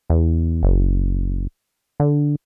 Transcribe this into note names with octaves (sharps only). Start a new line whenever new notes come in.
E2
F#1
D3